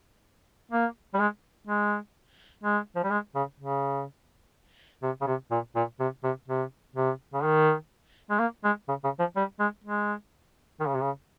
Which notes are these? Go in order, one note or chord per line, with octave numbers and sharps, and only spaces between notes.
A#3
G3
G#3
G#3
G#3
F3
G3
G#3
C#3
C#3
C3
C#3
C3
A#2
A#2
C3
C3
C3
C3
C#3
D#3
G#3
A#3
G#3
C#3
C#3
F3
G3
G#3
G#3
D#3
C#3
C3
C#3